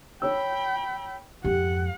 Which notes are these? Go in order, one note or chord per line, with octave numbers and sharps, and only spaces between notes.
C#5 G5 B5 E6
F2 G#2 G4 F#5